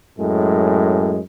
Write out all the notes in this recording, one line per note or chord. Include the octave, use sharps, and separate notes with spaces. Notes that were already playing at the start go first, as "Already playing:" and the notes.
F#2 A2 G#3